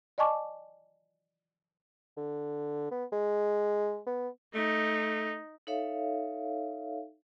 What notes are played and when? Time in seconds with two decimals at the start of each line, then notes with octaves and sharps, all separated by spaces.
0.18 D5 D#5 G#5 A5 C#6 D6
2.17 D3
2.91 B3
3.12 G#3
4.06 B3
4.55 A3 D#4
5.67 D#4 A4 C#5 E5 F5